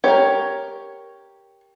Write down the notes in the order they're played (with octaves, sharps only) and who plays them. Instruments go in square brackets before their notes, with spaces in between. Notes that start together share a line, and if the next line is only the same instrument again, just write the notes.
[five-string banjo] G4 A#4 [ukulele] C#5